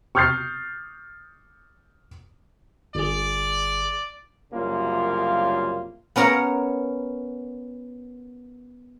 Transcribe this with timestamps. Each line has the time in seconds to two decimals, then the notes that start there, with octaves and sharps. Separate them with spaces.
0.15 C#6 D#6 F6 G6 A6 C7
2.95 G1 G#4 D5
4.53 C2 F#2 C#3 A#3 F4
6.16 B3 C#4 A#4 C#5 A#5